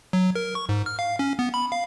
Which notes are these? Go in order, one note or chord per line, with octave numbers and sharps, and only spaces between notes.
F#3
A#4
C#6
G#2
F6
F5
C#4
B3
B5
F5